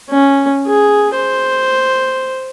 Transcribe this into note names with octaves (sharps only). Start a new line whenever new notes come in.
C#4
G#4
C5